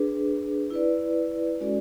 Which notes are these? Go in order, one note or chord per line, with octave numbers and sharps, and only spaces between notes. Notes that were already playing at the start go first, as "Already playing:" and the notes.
Already playing: D4 G#4 B4
E4 B4 D5
G#3 C#4 F#4 A4 D5